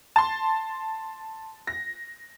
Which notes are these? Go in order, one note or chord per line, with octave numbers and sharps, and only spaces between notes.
A5 C6
A#6